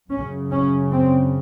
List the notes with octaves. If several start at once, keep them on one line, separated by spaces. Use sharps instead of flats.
F#2 C#3 C#4
C#4
C4